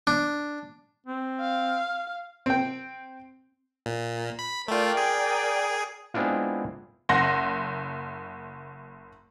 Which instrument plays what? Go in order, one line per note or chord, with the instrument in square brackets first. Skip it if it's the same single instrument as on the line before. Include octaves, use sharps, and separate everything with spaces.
[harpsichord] D4
[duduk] C4
[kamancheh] F5
[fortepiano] C4 G5
[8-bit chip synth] A#2
B5
[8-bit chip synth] A3 F4 [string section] A#4 D5 G5
[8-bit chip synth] G#4
[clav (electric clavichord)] G#3 B3 C4 D4 E4 F4
[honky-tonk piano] F#1 F#5 C6 A#6